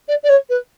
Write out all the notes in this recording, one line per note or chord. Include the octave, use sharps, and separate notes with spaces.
D5
D5
C#5
B4